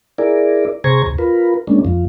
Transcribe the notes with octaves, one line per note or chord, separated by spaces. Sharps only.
E4 G#4 A#4 D5
C3 G#4 C5 A#5 C#6 G#6
D#2
F4 A#4 B4
G#3 A#3 C#4 D4
F2 F3